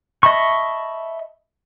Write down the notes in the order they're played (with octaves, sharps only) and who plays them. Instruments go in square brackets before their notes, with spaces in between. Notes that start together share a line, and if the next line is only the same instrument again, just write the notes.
[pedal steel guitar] D#5 E5 A5 B5 C#6